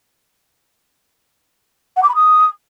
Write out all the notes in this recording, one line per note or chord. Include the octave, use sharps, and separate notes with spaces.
F#5
D6
B5
D#6